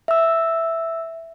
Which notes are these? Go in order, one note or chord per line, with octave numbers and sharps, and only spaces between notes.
E5 E6